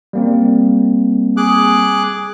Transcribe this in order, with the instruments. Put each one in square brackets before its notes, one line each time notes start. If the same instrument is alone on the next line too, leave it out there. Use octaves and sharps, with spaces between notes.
[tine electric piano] G3 A#3 C4
[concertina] G#4 D6 F#6